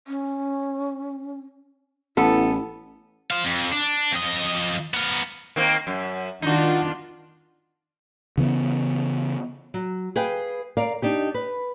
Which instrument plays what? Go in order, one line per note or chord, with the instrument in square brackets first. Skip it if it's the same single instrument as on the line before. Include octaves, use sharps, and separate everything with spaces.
[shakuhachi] C#4
[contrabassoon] A1 [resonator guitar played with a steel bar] B3 A4 [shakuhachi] E4
[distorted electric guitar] C5 F5
F2
D4
F2 D#5
B3 A#4
[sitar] D#3 A#3 C4
F#2
[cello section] D#3 D4 F4 [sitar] D#4 F#4
[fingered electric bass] C#3 E3 B3
[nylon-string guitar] F#3
G#4 B4 F5 G5
A#4 D5 F5
D4 D#4 G4
B4